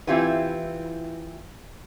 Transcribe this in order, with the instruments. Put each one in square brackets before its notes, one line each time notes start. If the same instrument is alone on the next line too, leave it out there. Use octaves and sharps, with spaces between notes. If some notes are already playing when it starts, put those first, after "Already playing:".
[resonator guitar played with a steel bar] E3 C4 E4 F4 G4 B4